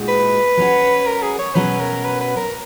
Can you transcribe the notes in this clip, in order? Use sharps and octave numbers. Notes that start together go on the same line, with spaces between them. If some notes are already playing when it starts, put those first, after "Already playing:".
Already playing: A#2 G#3 D#4 F#4
B4
F#3 C#4 F#4
A#4
G#4
C#5
B2 F#3 C#4 B4
A#4
B4
B4
A#4